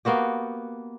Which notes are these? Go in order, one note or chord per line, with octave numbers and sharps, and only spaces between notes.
A#3 B3 F#4 G4